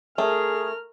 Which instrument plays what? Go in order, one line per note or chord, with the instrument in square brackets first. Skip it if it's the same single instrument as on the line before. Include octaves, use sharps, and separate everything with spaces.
[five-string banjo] A3 [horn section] G#4 [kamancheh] A#4 F6